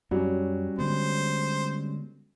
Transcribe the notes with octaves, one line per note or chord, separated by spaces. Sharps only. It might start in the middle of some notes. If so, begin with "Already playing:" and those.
F#2 F#3 G3 C#4
D3 G#3 B3 C5